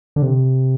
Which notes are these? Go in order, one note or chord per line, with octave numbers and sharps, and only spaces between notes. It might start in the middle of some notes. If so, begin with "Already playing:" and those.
D3
C3